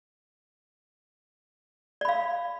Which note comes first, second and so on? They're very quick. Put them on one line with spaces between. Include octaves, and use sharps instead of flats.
D5 B5 F5